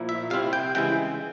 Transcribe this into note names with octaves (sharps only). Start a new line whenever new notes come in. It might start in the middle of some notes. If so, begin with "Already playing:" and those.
Already playing: A#2 F3 A#3 E4
E5
C3 G3 C4 E4 F5
G5
C#3 E3 G#3 E4 G5